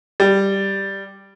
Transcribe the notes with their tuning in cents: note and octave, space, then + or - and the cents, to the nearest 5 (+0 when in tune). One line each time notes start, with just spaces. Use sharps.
G3 +0